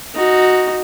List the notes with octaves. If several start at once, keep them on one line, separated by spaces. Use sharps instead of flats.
D#4 F#4